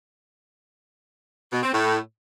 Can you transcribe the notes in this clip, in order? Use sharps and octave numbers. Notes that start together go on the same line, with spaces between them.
B2
C4
A2